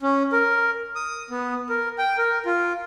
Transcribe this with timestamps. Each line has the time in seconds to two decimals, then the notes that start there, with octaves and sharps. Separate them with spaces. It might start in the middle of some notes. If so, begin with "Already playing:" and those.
0.02 C#4
0.32 A#4
0.95 D#6
1.30 B3
1.69 A#4
1.98 G5
2.18 A#4
2.46 F4